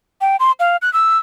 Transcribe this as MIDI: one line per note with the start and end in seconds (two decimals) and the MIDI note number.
0.21 0.36 79
0.40 0.52 84
0.60 0.77 77
0.82 0.92 90
0.93 1.18 88